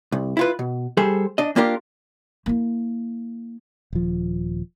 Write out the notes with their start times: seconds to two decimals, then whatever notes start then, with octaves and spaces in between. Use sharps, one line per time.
0.12 C2
0.37 E4 F4 B4
0.59 B2
0.97 G3 G#4 A4 C5
1.38 D4 D#5
1.56 A#3 D4 F4 G4 A#4
2.46 A#3 E4
3.93 D#1 F3